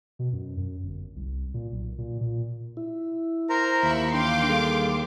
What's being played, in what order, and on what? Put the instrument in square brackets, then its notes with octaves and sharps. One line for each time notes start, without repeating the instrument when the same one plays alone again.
[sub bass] B2
F#2
F#2
G1
C2
A#2
B1
A#2
A#2
[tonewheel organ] E4
[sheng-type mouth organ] A#4 C5 A#5
[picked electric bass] D#2 [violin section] E5 B5 C#6
[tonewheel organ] E3 D4 [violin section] F5 C6 D6 [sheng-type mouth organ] G5
[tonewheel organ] G3 G#4 A4